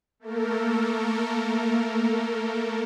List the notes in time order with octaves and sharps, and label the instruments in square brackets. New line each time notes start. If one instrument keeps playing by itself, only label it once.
[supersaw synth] A3 A#3 A4 A#4